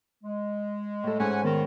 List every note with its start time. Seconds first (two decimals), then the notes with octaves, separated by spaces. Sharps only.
0.24 G#3
1.03 A2 A4
1.19 G#2 C#4 F#5 G#5
1.44 D#3 B3